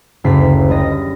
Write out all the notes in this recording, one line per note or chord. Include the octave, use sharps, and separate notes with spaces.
F#1 D2 C#3 B6 C7
G3 B4 D#5 A#6